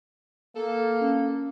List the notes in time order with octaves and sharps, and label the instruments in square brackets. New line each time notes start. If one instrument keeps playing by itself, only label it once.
[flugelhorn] A#3 [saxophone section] A4
[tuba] C#4